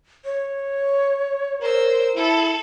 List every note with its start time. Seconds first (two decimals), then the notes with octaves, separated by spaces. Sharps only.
0.25 C#5
1.61 A#4 C5 E6
2.16 E4 A4